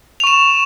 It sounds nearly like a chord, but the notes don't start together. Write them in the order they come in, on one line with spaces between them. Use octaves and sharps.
F7 C#6 E7